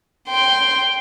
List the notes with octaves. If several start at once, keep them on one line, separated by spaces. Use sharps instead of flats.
G5 C6